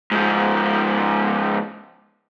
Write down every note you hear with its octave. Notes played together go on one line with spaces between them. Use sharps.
G#2 F3